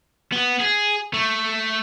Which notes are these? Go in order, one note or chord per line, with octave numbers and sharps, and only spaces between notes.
B3
G#4
A3